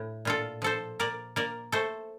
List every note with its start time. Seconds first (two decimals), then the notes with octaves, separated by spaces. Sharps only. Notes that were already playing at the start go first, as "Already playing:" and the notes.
Already playing: A2
0.25 A#2 F4 A4
0.62 F3 A4 C5
1.00 A#3 A#4 D5
1.36 A#3 A#4 D5
1.72 A3 A4 C5